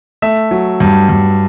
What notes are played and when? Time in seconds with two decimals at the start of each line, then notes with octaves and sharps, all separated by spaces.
0.22 A3 E5
0.51 F#3
0.80 G2
1.09 G2